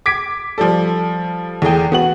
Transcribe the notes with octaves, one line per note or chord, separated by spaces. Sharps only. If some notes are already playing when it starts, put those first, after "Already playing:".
D6 G#6 B6 D7
F3 G3 A4
E2 A3 G#4 G5
B3 F#4 F#7